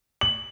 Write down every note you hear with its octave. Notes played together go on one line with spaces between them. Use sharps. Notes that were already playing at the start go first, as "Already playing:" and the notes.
F#7